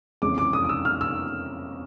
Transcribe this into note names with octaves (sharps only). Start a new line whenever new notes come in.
F2 C#3 E3 G#3 D6
D6
D#6
D#6
E6
F6
E6